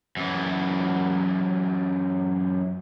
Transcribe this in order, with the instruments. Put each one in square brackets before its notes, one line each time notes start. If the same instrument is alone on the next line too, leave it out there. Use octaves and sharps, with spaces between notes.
[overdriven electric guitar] F#2 E3